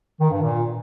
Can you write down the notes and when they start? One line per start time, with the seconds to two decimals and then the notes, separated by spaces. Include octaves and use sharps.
0.20 D#3
0.31 G2
0.41 A#2